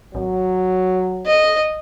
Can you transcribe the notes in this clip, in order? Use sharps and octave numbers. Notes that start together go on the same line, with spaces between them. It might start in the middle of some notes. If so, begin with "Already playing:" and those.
G#1 F#3
D#5